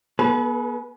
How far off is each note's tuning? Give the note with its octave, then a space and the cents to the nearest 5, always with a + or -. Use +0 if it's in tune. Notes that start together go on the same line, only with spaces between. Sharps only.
B3 -40 G#4 +45 B4 +0